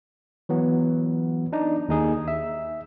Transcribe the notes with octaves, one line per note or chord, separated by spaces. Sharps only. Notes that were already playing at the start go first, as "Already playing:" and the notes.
E3 F#3 B3
D4 D#4
D#2 D#4 G#4
E5